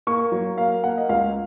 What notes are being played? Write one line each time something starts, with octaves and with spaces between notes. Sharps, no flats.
A#3 C#6
F#3
A#3 F5
A#3 F#5
D#5
C#2 F5